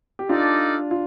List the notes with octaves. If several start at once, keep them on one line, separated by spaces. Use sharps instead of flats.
G4
D4 D#4 F4 A4 D5 F5
F4